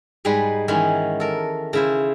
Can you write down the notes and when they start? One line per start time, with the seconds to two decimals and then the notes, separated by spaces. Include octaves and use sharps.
0.25 G#2 G3 G#3 G#4 B4
0.68 D#3 E3 G#3 B3 C#4
1.20 A4 A#4
1.73 C#3 E4 C5